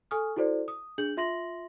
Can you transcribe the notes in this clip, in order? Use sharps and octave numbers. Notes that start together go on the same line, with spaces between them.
A4 G#5 C#6 D#6 F6
E4 F#4 A4 C5 D5
D#6
D4 G#4 G6 F#7
F4 E5 C6 A#6 F#7